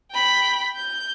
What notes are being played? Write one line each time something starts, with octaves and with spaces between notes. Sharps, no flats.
G5 B5
G6